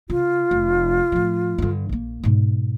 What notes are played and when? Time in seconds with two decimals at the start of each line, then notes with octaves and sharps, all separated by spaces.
0.10 C#3 F4
0.51 F1
1.12 A2 F3
1.58 G2 D3
1.89 A#1 A#3
2.24 G#2 B2